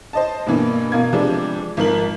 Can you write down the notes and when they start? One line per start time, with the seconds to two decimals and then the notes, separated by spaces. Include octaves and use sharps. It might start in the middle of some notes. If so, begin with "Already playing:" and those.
0.13 C5 D#5 A5
0.46 G2 B2 E3 A#3
0.92 B2 A#4 F5 G#6
1.12 C3 E3 F3 G3 G#3 D4
1.77 G#1 F3 A#4 F#7